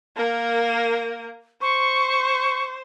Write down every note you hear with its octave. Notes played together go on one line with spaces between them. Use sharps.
A#3 A#4
C5 C#6